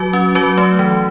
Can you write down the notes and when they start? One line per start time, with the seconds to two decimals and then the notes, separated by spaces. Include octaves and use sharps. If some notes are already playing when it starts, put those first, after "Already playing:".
Already playing: F#3 F#4 B4
0.13 C#4
0.35 F#3 F#4 B4
0.58 A3
0.79 E3